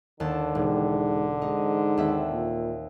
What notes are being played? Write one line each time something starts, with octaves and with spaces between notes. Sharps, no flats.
D#2 D3 A5
E1 G#2
G#2 D#4
D#2 C4 E5
A#2